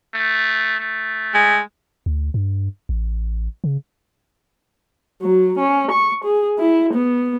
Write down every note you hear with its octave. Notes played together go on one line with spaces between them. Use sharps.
A3
A3
G#3
D2
G2
A1
C#3
F#3
C#4
C#6
G#4
E4
B3